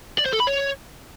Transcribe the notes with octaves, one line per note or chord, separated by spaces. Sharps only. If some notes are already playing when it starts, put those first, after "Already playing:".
D5
C5
A4
B5
C#5